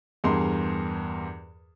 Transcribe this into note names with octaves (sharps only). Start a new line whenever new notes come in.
E2 G2 G#4 A#4 C6